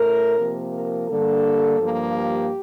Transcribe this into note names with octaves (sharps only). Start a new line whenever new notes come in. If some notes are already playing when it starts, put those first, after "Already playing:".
Already playing: A2 A3 A#4
C3 F3 A#3
A#4
G2 D3 G3 A#3 A4
G2 F3 A#3
G4